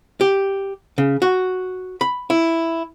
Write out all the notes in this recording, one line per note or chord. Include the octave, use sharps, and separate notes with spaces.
G4
C#3
F#4
B5
E4